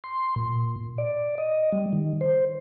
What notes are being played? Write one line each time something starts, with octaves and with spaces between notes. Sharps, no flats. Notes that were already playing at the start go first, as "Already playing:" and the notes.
C6
A#2
D5
D#5
G3
D#3
C5